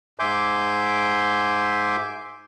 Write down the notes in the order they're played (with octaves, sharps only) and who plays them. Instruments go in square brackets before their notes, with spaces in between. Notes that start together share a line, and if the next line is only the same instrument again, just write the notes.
[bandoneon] G#2 E5 G#5 C6 D6 G6